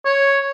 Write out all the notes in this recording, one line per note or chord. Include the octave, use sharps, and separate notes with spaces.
C#5